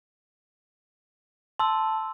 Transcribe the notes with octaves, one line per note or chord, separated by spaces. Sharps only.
A5 C6 E6